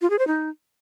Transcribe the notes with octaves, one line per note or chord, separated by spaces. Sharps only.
F4
G#4
C5
D#4